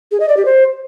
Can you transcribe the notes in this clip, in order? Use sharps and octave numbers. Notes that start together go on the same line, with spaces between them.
G#4
D#5
D5
G4
C5